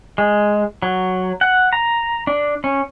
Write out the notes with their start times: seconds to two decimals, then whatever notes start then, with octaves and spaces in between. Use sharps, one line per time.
0.18 G#3
0.82 F#3
1.41 F#5
1.73 A#5
2.27 D4
2.64 C#4